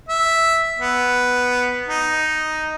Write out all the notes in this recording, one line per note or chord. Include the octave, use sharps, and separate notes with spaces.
E5
B3
D#4